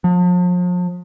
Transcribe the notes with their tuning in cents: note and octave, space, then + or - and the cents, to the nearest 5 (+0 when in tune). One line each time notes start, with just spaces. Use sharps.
F3 +40